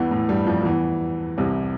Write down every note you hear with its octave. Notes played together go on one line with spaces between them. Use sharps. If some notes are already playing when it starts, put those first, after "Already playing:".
Already playing: E2 G2 E3
A2
G2 G3
F2 F3
F3
E2 E3
C2 C3